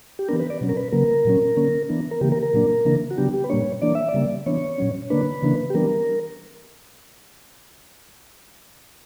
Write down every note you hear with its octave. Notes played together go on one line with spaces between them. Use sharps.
G4
E3 B3 D4 A#4
B4
D5
B2 F#3 C#4
A#4
B4
C#3 F#3 A#3 A#4
A#2 F#3 C#4
D3 A#3 C#4
E3 B3 D4
A#4
C#3 E3 A#3 G4
A#4
A#4
A#2 F#3 A#3 D4
C#3 E3 A#3 D4
F#4
C#3 F#3 B3 D4 G4
G4
B4
A#2 G3 A#3 D4 C#5
E3 A#3 D4 D5
E5
D5
C#3 G3 A#3
E3 B3 D4 C#5
A#2 F#3 C#4
D3 A#3 D4 B4
C#3 E3 A#3 D4
G4
E3 G3 B3 D4 A#4